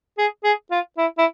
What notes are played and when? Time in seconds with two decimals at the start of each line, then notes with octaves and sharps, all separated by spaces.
0.18 G#4
0.44 G#4
0.71 F4
0.98 E4
1.18 E4